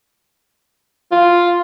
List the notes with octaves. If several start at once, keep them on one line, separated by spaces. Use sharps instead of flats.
F4